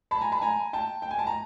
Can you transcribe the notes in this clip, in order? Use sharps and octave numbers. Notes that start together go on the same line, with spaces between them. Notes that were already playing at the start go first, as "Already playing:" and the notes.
A5 B5
G#5 A#5
A5 B5
G#5 A#5
G5 A5
G5
G#5
A5
A#5